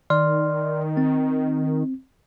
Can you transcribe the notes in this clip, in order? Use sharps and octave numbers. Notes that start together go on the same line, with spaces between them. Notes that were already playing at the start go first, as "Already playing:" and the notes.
D#3 D5 C6 F6
C4